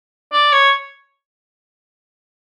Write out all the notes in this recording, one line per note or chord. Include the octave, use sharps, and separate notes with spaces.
D5
C#5